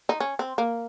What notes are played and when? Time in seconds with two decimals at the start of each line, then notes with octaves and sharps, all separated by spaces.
0.09 D#4
0.20 C#4
0.39 C4
0.58 A#3